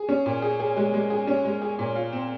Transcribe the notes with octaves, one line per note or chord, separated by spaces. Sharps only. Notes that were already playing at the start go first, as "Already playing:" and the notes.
Already playing: G#4
C#4
A#2
G#4
G#4
G#3
G#3
G#4
C#4
G#3
G#4
A#2
F4
C4